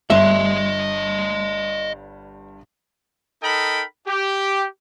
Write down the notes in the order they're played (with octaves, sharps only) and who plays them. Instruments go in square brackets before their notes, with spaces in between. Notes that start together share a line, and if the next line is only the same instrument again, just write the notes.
[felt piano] G1 G2 [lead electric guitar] D#5 C6 [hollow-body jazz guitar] E5
[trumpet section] D#4 A4 A#4 D#5 G5 B5
G4